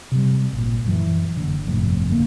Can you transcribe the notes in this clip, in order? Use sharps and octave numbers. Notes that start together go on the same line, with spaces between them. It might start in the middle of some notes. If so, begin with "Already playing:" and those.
C3 G3
G#1 A#2
F#2 E3
F#1 D3
G1 F2 A2 C3
G1 D3 A#3